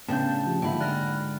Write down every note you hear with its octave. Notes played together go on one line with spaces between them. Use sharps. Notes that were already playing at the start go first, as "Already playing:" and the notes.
A2 C#3 B3 D4 G5 A5 G6
F3 F4 G4
G#2 D3 A#3 F4 E5 G5 B5
D5 F6 F#6 A#6